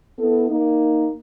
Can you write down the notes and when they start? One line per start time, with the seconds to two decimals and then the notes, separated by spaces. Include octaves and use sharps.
0.19 B3 E4 A4
0.49 A#3 D#4